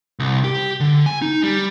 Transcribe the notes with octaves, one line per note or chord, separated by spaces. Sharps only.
C2
G4
D3
G#5
D#4
G3